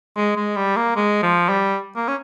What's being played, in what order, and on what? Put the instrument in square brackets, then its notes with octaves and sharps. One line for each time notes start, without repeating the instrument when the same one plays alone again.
[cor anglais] G#3
G#3
G3
A#3
G#3
F3
G3
A#3
C#4